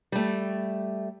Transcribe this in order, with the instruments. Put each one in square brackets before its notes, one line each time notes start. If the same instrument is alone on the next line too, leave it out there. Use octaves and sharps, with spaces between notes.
[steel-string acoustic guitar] G3 A3